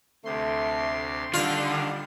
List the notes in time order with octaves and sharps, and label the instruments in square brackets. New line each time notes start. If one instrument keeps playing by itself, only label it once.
[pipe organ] D2 C3 C6 [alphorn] A3
[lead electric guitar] D3 [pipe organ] D#3 [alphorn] G3 [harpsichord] F4 F5